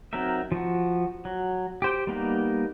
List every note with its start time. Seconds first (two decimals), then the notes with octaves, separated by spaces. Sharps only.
0.13 F#3 C4 D#4 A#4 E5
0.52 F3 F#4
1.25 F#3
1.82 G4 C5 G5
2.07 G3 A#3 B3 D#4